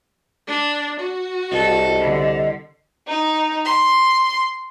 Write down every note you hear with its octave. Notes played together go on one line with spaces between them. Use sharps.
D4
F#4
C2 A4 D#5
D3
D#4
C6